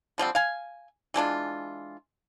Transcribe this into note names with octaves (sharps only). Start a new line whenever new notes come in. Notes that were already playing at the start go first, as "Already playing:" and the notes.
D3 F3 G3 C4
F5 G#5
E3 G#3 D4 F4